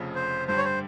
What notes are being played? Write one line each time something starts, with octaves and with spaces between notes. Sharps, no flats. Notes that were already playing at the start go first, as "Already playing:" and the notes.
Already playing: F1 F2 C#3
C5
G2 D3 G3 C5
C#5
C5